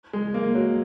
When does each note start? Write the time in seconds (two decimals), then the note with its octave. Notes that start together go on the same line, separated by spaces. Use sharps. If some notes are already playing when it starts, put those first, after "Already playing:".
0.13 G#3
0.34 A#3
0.55 F#3